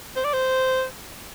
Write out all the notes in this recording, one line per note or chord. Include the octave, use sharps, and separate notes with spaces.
C5
D5
C5